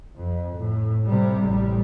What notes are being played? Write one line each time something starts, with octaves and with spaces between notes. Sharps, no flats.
F2
A2
C3 G3
A1 G3